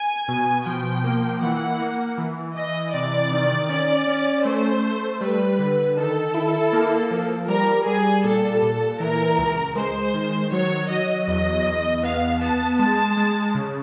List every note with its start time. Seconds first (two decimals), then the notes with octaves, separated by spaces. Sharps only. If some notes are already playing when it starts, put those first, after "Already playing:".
Already playing: G#5
0.28 B2
0.66 F3 G5
1.04 A#3
1.41 E3 F#5
1.80 A#3
2.18 E3
2.56 E3 D#5
2.94 C3 D5
3.31 D#3
3.69 C#4 D5
4.07 C#4
4.45 A3 C5
4.83 A3
5.21 G3 B4
5.59 D3
5.97 D#3 A4
6.34 E4
6.73 A#3
7.11 F3
7.48 G3 A#4
7.86 G3 G#4
8.24 A#2 A4
8.62 A#2
8.99 E3 A#4
9.38 C#2
9.76 G#3 C5
10.14 D#3
10.52 F#3 C#5
10.89 F#3 D#5
11.28 E2 D#5
11.65 E2
12.03 B3 F5
12.41 B3 A5
12.79 G#3 A5
13.17 G#3
13.55 C#3